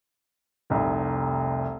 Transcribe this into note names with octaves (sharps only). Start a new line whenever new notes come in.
F1 C2